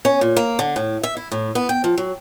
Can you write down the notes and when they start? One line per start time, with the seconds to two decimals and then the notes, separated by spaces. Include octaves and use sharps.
0.05 C#4
0.21 A#2
0.37 A#3
0.59 D3
0.76 A2
1.03 E5
1.17 E4
1.32 A2
1.55 B3
1.69 G5
1.84 F3
1.98 F#3